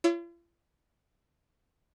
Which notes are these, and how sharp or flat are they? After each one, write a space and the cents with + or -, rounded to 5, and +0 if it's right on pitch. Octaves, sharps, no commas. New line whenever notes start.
F4 -45 C#5 +15 E6 +0